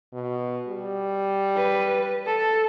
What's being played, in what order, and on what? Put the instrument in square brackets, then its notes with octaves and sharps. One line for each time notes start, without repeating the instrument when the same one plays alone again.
[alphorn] B2
G3
[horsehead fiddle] B4
A4